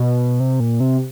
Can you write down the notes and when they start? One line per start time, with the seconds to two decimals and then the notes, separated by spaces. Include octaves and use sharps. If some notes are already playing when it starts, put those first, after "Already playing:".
Already playing: B2
0.40 C3
0.60 A#2
0.80 C3